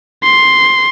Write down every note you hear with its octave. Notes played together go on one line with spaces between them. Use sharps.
C6